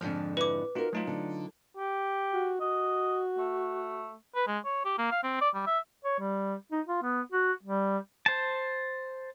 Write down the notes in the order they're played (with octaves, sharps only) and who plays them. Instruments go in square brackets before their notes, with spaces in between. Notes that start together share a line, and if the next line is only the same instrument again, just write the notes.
[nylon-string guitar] F2 G#2 D3 [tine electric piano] F3 D4
[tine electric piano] E4 [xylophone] B4 D6
[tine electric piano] D#4 F4 [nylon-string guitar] F#4 A#4
[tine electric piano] F#3 D#4 F4 [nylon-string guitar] A3
[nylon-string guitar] D3
[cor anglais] G4
[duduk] F#4
[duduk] F#4 [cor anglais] D#5
[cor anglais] A3
B4
G#3
C#5
G4
A#3
F5
C4
D5
G3
E5
[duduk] C#5
G3
D#4
F4
B3
F#4
G3
[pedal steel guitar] C5 A5